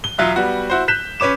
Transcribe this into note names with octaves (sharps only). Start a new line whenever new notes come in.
G7
E1 F#3 F4 E5 F#6
G3 B3 F#4
E4 F#4 C5
F#6 G6 B6 E7
C#4 B4 C#5 D6 E7